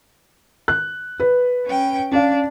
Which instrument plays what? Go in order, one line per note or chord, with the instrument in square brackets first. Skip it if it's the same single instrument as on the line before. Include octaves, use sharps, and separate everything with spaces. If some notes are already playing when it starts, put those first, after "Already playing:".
[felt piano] F#6
B4
[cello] C#4 G5
[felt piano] C#4 F5 [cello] D4